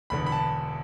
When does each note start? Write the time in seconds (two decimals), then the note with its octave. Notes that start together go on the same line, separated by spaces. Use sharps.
0.10 E1 E2 D3 B3 B5
0.26 B5
0.32 A5